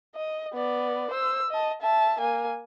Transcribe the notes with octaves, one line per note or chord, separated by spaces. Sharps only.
D#5
B3 D5
C5 E6
D#5 A5
E5 A5
A#3 G#5